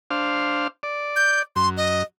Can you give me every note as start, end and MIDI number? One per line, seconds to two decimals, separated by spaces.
0.11 0.68 62
0.11 0.68 72
0.11 0.68 77
0.83 1.43 74
1.16 1.41 91
1.56 2.03 42
1.56 1.69 84
1.77 2.02 75